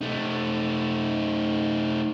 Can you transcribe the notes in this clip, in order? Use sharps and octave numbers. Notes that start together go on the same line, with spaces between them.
A3 D#4